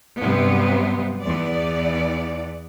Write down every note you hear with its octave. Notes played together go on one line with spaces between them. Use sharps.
G2 C3 F#3 G3 B3 C4
E2 B3 D5